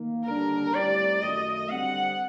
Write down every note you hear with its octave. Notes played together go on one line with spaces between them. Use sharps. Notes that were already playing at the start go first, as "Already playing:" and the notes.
Already playing: D#3 A#3
D#2 D3 G3 D4 G4 A#4
A2 G3 C4 G4 D5
F#2 D#3 A3 D#5
D3 G3 C4 F#5